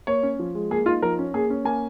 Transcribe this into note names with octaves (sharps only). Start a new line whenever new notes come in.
A#3 C#5
C#4
F3
G#3
A#3 G#4
D#4 F4
F3 A#4
C#4
A#3 G#4
C#4
A#3 G#5